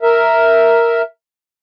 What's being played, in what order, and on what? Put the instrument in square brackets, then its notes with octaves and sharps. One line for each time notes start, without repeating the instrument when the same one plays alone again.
[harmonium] A#4 E5